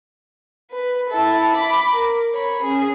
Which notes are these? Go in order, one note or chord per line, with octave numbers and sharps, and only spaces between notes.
B4
E4 A4
B5 D6
A#4
C#5 B5
C#4 G#4